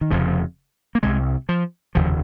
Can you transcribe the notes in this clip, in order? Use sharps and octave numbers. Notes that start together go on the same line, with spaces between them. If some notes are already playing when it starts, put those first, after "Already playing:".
D#3
F1 F2 C#3 F3
A#3
C2 C3 G#3
F3
F1 D#2 C#3 F3